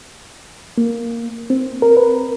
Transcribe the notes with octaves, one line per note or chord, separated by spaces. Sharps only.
A#3
C4
A#4
B4